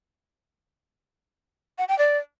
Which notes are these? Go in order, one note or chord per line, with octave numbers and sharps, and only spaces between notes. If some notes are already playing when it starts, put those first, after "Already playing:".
F#5
G5
D5